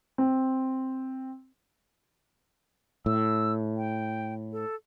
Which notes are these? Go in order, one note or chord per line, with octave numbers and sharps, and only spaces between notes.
C4
A2 E6
G5
A4